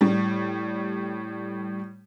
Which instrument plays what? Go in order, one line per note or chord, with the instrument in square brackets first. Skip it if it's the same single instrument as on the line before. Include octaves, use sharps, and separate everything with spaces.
[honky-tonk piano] A2 G3